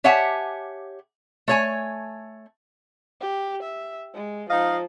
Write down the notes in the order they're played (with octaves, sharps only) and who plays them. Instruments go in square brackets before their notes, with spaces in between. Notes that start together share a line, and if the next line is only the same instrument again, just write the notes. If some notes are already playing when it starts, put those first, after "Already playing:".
[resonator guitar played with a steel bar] G4 C#5 E5 F#5 G#5 A5
A3 C#5 G#5
[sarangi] G4
E5
G#3
[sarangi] F3 [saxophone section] D#4 D#5 F5